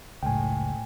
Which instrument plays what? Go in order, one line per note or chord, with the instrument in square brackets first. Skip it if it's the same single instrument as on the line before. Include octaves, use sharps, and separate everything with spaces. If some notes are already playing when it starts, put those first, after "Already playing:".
[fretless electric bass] F#1 C#2 [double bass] A2 [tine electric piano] G5 G#5